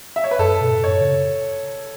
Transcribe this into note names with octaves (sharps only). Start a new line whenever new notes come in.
E5
C#5
B4
F#2 A4
B2
A2
F#2 C#5
C#3